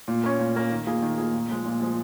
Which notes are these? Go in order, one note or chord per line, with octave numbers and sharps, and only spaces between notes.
A#2
A#3 C#4
A#2
A#3 C#4
D#3
A#3 F4 G#4
D#3
A#3 F4 G#4
A#2
F3 G#3
A#2
F3 G#3